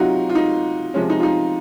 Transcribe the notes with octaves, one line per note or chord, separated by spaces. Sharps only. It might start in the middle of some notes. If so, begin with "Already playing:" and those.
Already playing: C3 F#3 D#4 F4 F#4
F4
D#4
C3 F3 G#3 C#4
D#4
F4
D#4